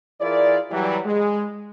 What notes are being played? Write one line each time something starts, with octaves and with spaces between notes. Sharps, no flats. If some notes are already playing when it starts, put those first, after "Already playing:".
E3 E4 F4 G#4 A#4 D5
E3 F#3 G3
G#3